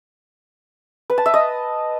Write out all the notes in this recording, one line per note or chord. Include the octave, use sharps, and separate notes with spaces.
B4
A5
E5
D#5